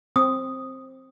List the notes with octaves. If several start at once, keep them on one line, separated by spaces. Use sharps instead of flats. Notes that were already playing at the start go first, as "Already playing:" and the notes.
C4 D#6